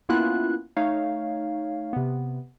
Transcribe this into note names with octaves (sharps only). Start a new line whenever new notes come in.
A#3 B3 C#4 E4 F4 F#6
A3 D#4 C#5 F5
C3 B3